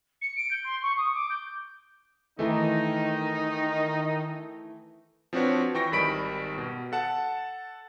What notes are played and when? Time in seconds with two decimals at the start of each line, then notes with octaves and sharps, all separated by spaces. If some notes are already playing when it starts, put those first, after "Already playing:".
0.21 C#7
0.37 D7
0.51 G6
0.64 C6
0.82 C#6
0.97 D#6
1.14 D6
1.30 G6
2.39 D#3 E3 A3 D#4
5.33 F3 C4 D4 F#4 B4 C#5
5.74 E3 G5 C#6 A#6
5.92 G#1 D#3 G3 B5 B6 D7
6.58 B2
6.92 A4 F#5 A5